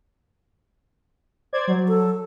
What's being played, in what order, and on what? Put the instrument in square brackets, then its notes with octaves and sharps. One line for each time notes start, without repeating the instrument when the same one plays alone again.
[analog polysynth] C5 D5 G#6
F#3
[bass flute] A4